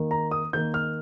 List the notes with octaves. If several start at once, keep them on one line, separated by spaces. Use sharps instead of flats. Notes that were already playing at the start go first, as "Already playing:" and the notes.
Already playing: D#3 A#3
A#5
D#6
D#3 A#3 G6
F6